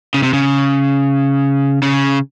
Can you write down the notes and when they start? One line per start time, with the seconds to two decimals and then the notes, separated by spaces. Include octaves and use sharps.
0.14 C#3
0.23 C3
0.33 C#3
1.82 C#3